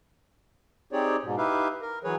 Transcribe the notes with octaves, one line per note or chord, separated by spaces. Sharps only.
C4 D#4 G4 G#4 C#5 D5
G#2 B2
D#4 E4 G4 B4 E5 F5
A#4
E3 F#3 G#4 B4 C#5